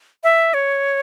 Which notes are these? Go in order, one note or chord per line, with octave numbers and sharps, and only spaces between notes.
E5
C#5